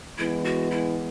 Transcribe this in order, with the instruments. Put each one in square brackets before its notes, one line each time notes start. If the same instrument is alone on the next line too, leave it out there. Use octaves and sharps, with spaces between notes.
[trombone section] E3 G#3 B3 [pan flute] E4
[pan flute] F#4
E4